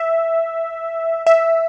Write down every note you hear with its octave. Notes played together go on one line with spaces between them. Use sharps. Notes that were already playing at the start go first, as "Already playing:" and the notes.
Already playing: E5
E5